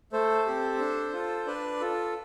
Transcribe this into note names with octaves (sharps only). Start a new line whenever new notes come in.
A3 A4 C5
C4 G4
D4
F4 A4
D4 B4 D5
F4 A4